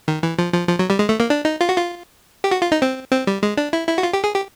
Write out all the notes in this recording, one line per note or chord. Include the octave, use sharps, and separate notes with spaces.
D#3
E3
F3
F3
F3
F#3
G3
G#3
A3
A#3
D4
D#4
F4
F#4
F4
G4
F#4
F4
D#4
C4
C4
G3
G#3
D4
E4
E4
F#4
F4
G4
G#4
G4